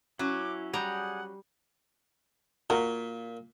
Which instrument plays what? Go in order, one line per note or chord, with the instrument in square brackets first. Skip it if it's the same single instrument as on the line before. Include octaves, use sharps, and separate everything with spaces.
[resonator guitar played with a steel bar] F#3 C#4 [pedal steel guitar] E4 [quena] D6
[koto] G3 A#5 [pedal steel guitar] G#4 D5 G6 [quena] F#5
[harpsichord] A#2 [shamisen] F#4 A#4